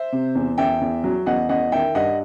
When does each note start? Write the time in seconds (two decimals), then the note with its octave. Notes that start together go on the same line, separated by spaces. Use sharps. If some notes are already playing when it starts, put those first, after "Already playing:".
Already playing: C5 E5
0.12 C3
0.35 E2
0.58 E2 E5 G5
0.81 E2
1.04 F#3
1.26 E2 D#5 F#5
1.49 E2 D#5 F#5
1.72 D#3 E5 G5
1.94 G2 D#5 F#5